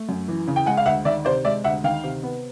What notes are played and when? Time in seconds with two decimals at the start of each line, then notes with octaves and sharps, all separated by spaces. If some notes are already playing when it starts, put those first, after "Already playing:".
Already playing: A3
0.09 F#2
0.28 E3
0.48 C#3
0.56 G5
0.66 G#3 F#5 G#5
0.77 F5
0.86 D2 E5 F#5
1.05 D#3 D5 E5
1.25 C3 C5 D5
1.45 G#3 D5 E5
1.64 D2 E5 F#5
1.84 D#3 F5 G5
2.03 C3
2.23 B3